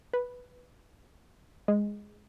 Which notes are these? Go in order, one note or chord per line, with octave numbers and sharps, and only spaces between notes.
B4
G#3